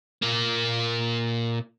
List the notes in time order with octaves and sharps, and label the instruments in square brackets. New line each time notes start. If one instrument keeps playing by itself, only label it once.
[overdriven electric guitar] A#2 A#3